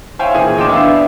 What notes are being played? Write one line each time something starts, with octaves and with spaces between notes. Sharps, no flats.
E4 C5 C#5 F5 G5 G#5
A#2 E3 G#4 G#5
D2 D#5 G5 C6 D6 E7
B3 D4 E4 D5 F5